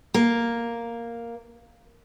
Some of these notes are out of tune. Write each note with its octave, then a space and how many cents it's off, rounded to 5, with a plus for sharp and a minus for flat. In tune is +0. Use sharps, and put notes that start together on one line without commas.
A#3 +0